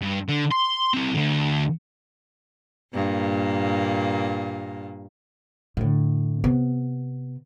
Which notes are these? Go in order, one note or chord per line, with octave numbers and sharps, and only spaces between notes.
G2
D3
C6
C4 E4
D2 D3
G2 A#2 A#3
A2 D3
C3 B3